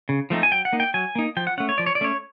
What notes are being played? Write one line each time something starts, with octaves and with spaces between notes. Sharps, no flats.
C#3
F3 A3 C4 D#4
G#5
F#3 G5
F#5
A#3 D#4
G5
F#3 G#5
A#3 D#4
F3 G5
F#5
A3 C#4 F#5
C#5
F3 D5
C#5
D5
A3 C#4 C#5